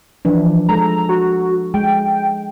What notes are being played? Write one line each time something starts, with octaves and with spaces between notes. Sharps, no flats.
E3 F3 D4
G#3 A4 A#5
F#4
G#3 G5